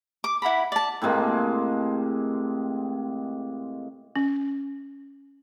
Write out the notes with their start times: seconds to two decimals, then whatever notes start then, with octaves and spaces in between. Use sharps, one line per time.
0.24 D6
0.42 E4 F#5 A#5 B5
0.72 D5 A5
1.02 A2 C3 G#3 A#3
4.16 C#4